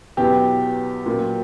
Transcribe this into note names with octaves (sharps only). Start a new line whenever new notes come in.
E2 B2 F#3 G4
A#2
F#3